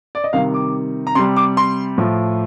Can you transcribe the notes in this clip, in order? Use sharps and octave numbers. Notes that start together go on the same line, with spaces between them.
D5
D#5
C3 D#3 G3 F5
D6
A#5
C3 G3 C6
D6
C6
A2 F3